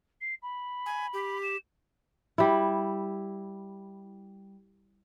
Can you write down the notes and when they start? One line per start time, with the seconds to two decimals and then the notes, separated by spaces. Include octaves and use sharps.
0.21 C7
0.42 B5
0.86 G#5
1.14 G4
1.43 E7
2.38 G3 E4